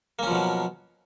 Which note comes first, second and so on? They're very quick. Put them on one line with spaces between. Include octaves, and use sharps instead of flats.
A#3 C#4 F3 B2 F#3